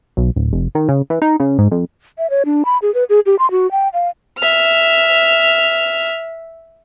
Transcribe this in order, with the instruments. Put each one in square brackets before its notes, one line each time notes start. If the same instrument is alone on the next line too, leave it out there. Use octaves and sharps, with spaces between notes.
[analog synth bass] B1
D1
F1
D#3
C#3
E3
D#4
C#3
G#2
F2
[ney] E5
C#5
D4
B5
G#4
B4
G#4
G4
C6
F#4
G5
F5
[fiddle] E5 F6